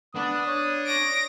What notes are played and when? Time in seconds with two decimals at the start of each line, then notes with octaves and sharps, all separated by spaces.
0.16 B3 D4 D#6
0.47 C#5
0.86 A#6 D7